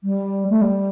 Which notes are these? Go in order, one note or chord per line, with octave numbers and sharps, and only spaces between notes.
G3
A3
G3